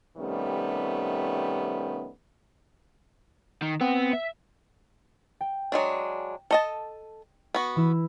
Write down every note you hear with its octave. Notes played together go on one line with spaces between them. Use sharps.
C3 D#3 G3 A3 B3 C#4
D#3
B3 C4
E5
G5
F#3 G#3 D4
A4 D#5 A5
B3 F#4
E3 E4